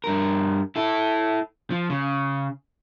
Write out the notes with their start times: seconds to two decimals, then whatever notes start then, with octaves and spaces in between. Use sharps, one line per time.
0.04 G2 A#4
0.76 E4 A4
1.71 F3
1.90 C#3